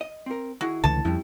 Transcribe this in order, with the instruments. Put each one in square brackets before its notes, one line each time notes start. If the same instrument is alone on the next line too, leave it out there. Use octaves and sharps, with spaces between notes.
[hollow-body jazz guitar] D#5
C4 A#4
[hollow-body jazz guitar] D#3 E4 G#4 [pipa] F#4
[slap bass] C#2 D3 E3 [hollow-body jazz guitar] A2 [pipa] A5
[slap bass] F2 [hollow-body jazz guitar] G3 C#4 E4